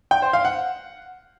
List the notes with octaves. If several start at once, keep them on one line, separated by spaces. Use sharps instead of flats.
G5
C5
F5
F#5